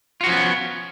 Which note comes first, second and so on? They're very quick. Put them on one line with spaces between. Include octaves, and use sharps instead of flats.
F4 F#4 F3 C#4 B3